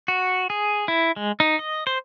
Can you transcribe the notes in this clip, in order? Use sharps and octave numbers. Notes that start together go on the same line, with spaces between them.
F#4
G#4
E4
G#3
D#4
D#5
C5